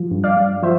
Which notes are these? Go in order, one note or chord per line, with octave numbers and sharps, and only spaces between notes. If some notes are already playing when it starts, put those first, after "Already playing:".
Already playing: F3
G2
D5 F5
G2
F3 C5 E5